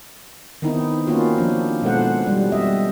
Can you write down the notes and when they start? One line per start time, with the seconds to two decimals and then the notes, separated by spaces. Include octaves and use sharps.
0.62 D#3 B3 C4 D#4 E4
1.07 A#3 C4 C#4 F4 F#4
1.37 F3 D4 D#4
1.82 B2 G#3 F4 A4 C5 F#5
2.26 G3
2.52 C4 D#5 E5